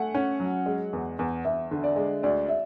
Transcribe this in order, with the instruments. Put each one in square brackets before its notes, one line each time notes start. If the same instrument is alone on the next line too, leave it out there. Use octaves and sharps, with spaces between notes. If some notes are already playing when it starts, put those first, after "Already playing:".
Already playing: [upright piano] A3 [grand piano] F#5 G#5
[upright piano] C#4
F#3
G#3
E2
E2
[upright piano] E2 [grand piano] E5
[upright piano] D3
[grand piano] D5
[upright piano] G#3
[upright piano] D2 [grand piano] D5
[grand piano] E5